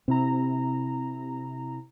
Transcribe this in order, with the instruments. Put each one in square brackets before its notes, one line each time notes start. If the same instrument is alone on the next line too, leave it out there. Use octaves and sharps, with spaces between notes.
[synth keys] C3 E4 A#5 [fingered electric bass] C4